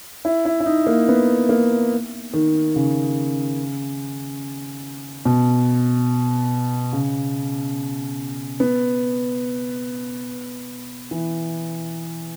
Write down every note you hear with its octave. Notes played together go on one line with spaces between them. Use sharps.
E4
E4
E4
D#4
A#3
B3
A#3
D#3
C#3
B2
C#3
B3
E3